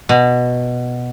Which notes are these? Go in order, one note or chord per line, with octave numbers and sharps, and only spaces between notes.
B2